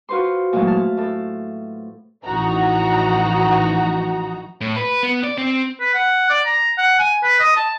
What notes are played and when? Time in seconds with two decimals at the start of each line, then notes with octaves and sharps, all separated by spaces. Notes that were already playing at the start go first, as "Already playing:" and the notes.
0.09 F4 F#4 B4 C5 C6
0.53 A#2 E3 F#3 G#3 A3
0.67 A5 F6
0.97 A2 A4
2.25 A1 E3 F3 D#4 F#4 A#5
4.61 A2
4.76 B4
5.03 B3
5.24 D5
5.38 C4
5.80 B4
5.94 F#5
6.30 D5
6.46 A#5
6.78 F#5
6.99 G#5
7.23 B4
7.40 D#5
7.56 A5